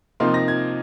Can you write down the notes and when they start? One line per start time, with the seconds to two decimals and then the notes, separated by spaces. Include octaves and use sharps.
0.20 C3 F3 A#3 D#4 C6
0.34 A#6
0.48 G#6